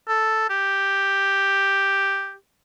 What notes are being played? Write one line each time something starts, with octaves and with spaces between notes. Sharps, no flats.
A4
G4